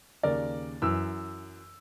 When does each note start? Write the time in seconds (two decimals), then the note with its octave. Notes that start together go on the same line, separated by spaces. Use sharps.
0.23 D#2 C#3 A#4 D5
0.82 F#2 E3 E6